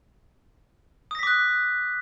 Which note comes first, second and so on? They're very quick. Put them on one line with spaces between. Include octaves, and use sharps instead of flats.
D#6 A#6 B6 D6 F#6